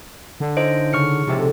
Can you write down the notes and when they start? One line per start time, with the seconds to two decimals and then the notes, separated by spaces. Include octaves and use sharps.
0.40 D3
0.57 C#4 D#4 E4 C5 D#5 D7
0.93 C#3 C#6 F6 C#7
1.27 A#1 C3 G#3 A4